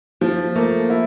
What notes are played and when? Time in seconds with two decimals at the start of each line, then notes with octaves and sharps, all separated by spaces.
0.21 F3 A3
0.55 A3 A#3
0.90 E4